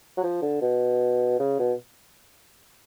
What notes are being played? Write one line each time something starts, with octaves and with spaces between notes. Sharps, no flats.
F#3
F3
D3
B2
C#3
B2